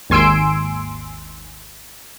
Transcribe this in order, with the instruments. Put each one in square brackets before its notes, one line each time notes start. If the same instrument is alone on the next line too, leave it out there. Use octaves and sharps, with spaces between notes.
[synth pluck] G#1 D#2 G#5 C6 E6 D7